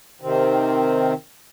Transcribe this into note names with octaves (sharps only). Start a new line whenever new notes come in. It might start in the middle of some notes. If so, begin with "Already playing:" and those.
C3 D#3 C4